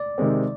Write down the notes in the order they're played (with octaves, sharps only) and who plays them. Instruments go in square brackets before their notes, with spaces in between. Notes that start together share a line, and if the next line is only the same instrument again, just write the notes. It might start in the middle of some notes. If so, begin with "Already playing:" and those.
Already playing: [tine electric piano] D5
[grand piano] C3 D#3 G#3 C4